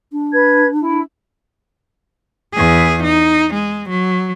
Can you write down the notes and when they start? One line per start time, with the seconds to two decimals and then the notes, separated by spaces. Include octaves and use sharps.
0.12 D4
0.32 B4 G#6
0.80 E4
2.54 E2 G#4
3.03 D#4
3.54 G#3
3.90 F#3